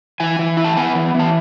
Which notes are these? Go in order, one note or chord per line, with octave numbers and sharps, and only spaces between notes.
E3 G#5
E3
E4
A5
B3 G#5
E3
E3
A5